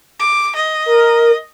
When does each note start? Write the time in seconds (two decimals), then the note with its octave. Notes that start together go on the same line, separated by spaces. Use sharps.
0.20 D6
0.55 D#5
0.86 A#4